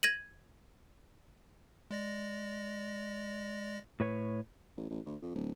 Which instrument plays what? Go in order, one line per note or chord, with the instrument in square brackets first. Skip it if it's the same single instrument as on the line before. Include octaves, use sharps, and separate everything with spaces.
[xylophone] G#6 A#6 D#7 F#7
[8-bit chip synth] G#3 D5 A#6
[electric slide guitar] A2 B4 C#5
[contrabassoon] A1
A1
D2
F2
D1